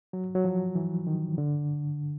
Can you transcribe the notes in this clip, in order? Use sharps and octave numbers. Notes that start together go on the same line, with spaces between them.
F#3
F#3
F3
E3
D#3
D3